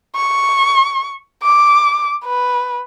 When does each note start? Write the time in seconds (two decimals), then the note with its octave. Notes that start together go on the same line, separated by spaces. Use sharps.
0.16 C#6
1.43 D6
2.25 B4